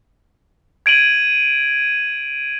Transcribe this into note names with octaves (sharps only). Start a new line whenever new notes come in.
G#6 D7 D#7 F#7